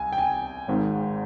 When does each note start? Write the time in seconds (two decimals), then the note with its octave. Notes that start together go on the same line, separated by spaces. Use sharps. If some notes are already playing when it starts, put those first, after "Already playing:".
Already playing: C2 G#5
0.12 G5
0.18 G#5
0.68 G#1 G#2 D#3